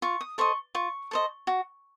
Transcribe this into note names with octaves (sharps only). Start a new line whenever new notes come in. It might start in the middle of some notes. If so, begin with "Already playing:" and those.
F4 C#6
D#6
A4 C5 D#5 C#6
F4 C#6
A4 C5 D#5
F#4